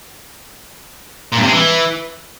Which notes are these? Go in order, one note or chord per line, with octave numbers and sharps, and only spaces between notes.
A#2
G2
C3
G#3
E3